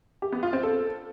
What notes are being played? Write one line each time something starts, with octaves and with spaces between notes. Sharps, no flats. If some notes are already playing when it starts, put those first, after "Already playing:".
G4
B3
F4
C4
A4